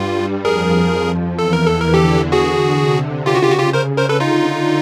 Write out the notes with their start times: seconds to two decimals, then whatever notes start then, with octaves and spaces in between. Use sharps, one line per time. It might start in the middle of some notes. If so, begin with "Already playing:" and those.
Already playing: G2 G3 F4
0.44 F2 F3 G#4 A#4
1.38 E2 E3 A4
1.53 A#4
1.66 A4
1.80 A#4
1.86 D3
1.94 G4 A4
2.32 F#4 G#4
2.80 C3
3.26 C#3 F4 G4
3.35 F#4
3.42 F4 G4
3.52 F#4
3.59 F4 G4
3.73 A#4 C5
3.97 A#4 C5
4.09 A4 B4
4.20 D3 D#4 F4